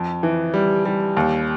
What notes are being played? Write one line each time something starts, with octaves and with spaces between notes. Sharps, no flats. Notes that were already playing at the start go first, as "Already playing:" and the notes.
Already playing: F2
E3
G3
G3
D#2